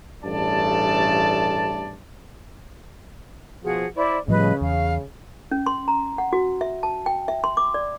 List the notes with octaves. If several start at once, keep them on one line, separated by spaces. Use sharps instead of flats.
A1 G2 C#3 A3 D5 A5
B2 F3 F#4 G#4 F#5
E4 C5 D5
A2 C#3 F3 G3 B4 D#5
E2 F5
C#4
C6
A#5
F#5
F#4
E5
A5
G5
E5
C6
D6
D5